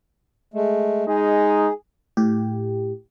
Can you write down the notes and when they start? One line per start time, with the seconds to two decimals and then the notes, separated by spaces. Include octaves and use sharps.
0.54 G#3 A3
1.08 G#3 D#4 G#4
2.17 A2 G4